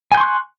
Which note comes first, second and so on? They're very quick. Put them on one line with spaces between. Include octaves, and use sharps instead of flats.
G#5 G6 C6 C#6 F#6